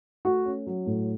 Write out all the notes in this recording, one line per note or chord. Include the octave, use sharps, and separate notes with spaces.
A3 F#4
C#4
F#3
A2